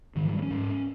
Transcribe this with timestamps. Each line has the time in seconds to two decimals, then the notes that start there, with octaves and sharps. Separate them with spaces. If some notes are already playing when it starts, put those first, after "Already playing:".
0.16 G#2 D#3
0.25 F3
0.33 G3
0.42 C#4
0.51 G#2